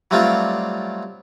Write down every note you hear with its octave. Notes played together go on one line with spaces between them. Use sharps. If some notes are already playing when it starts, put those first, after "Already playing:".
F#3 G3 A3 C4 D4 F4